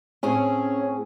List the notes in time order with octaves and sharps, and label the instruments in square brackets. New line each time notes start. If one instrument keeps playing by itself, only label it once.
[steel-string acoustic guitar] A2 C4 G#4 [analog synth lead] C#4